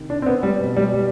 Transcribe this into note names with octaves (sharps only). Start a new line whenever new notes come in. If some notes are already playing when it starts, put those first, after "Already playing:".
Already playing: C3 D#3
D4
C4
B3
G3
B2
G3
G3